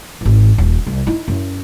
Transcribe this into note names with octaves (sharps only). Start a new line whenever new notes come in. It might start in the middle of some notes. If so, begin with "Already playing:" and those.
G#1 E3
D#1
C2
D#4 E4
F#2